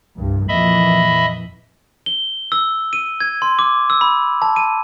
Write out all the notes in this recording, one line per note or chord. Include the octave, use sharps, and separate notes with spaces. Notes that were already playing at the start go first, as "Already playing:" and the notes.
C2 G2
F2 A#2 E3 D#5 E5 B5
G7
E6
D#7
G#6
C6
D6
E6
B5
A5
D#7